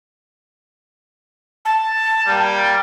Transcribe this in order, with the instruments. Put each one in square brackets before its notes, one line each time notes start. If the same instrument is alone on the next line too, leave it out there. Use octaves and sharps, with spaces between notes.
[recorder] A5
[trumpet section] G3 A#3 G5